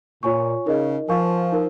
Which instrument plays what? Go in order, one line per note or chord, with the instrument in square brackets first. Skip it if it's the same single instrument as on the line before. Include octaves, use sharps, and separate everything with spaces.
[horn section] A#2 [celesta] F4 C#5 G#5 C#6
[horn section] C#3 [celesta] D#4 A#4 D#5
[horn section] F3 [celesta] A#4 F5 G#5 C#6
[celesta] D#4 A#4